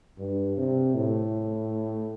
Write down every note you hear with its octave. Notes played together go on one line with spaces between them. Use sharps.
G2
C3
A2